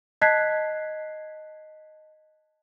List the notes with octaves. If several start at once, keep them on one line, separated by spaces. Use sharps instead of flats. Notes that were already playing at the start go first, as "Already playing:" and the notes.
D#5 A5 F#6 G#6 B6 C7